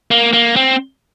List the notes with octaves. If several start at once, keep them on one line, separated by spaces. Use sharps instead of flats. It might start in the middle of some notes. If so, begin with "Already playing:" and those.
A#3
A#3
C4